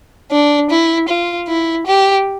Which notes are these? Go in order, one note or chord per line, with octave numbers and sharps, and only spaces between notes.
D4
E4
F4
E4
G4